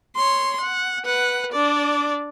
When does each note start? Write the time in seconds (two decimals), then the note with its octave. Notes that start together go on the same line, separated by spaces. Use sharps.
0.16 C#5 C6
0.60 F#5
1.05 B4 F#5
1.52 D4 D5